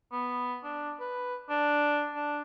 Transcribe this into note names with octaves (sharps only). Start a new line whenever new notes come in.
B3
D4
B4
D4
D4